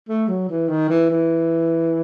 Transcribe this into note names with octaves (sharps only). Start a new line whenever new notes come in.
A3
F#3
E3
D#3
E3
E3